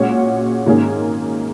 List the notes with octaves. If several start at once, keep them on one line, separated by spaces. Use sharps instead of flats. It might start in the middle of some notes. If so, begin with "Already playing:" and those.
Already playing: A#2 G#3 C#4 F#4 C#5
G#2 D#3 A#3 C#4 G#4